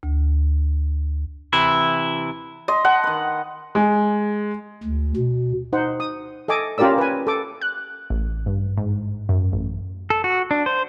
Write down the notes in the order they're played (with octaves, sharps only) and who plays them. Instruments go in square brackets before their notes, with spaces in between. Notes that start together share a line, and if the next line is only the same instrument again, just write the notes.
[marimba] D2
[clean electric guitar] C3 E3 E4
[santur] D#5 [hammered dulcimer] C6
[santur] F#5 [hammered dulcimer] A5
[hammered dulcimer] D#3 B4
[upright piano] G#3
[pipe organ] D2
B2
[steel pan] D#4 C5 F#5
D#6
A4 D#5 G#5 D6
C#4 F4 G4 A#4 D5 E6
B4 G#5
A4 D6
[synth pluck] F#6
A1
G2
G#2
F#2
A1
[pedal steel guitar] A4
F#4
D4
C5